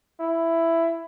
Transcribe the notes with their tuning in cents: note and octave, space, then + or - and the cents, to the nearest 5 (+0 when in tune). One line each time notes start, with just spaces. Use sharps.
E4 +10